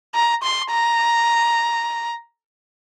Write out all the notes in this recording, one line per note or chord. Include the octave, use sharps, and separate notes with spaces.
A#5
C6
A#5